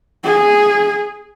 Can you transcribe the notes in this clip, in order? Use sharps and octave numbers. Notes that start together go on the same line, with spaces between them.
G#4